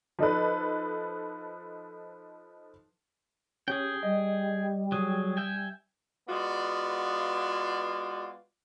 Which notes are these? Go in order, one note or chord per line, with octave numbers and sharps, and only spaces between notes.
F3 D#4 A4 B4
C#4 G4 G#4 G5
G3 D#5
F#3 G#4 D#6
E5 G5 G#5
G#3 B3 F4 F#4 D5